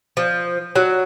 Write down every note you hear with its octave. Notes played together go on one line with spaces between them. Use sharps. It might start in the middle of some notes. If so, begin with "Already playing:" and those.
F3
F#3